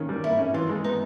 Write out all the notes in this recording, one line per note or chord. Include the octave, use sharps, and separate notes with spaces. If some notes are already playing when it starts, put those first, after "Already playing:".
Already playing: D#3 A#3 C#4
G3
A#3 E4
C#4
E3 F4
G#3
B3 D#4